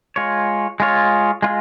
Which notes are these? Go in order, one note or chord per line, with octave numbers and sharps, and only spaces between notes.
G#3 F4 C#5
G#3 F4 C#5
G#3 F4